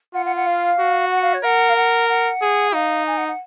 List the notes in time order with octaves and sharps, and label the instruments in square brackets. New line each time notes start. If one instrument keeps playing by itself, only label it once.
[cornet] F4 [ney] F#5
[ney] F#5
F#5
F5
[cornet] F#4
[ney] F#5
F5
C#5
[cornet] A#4 [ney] F#5
[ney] F5
F#5
F#5
[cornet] G#4
[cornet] D#4 [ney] F5
[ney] G#5
F#5
F#5